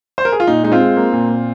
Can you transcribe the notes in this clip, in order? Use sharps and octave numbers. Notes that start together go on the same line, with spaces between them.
C5
A#4
G#4
F4
A#2 D#4
G#3 D#4
C4 F4
G#3
A#3
A#2
A#2